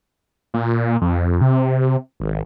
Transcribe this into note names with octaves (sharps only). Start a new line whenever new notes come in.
A#2
F2
C3
G#1